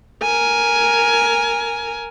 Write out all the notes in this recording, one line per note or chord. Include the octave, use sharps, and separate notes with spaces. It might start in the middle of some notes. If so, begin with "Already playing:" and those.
A#4 G#5